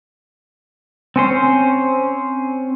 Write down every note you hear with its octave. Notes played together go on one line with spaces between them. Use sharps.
C4 C#4 C5